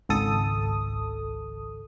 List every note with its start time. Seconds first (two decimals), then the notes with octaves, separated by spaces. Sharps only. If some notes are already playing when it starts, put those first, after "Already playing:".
0.09 G#1 C#2 A4 D#6